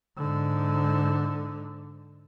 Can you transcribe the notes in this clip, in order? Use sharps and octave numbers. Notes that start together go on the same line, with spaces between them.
G#2 D3